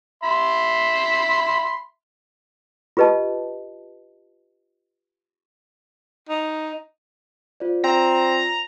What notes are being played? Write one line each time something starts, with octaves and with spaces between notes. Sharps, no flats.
E5 B5 C6
F4 G4 B4 D#5 A5
D#4
F4 C5 D5
C4 A#5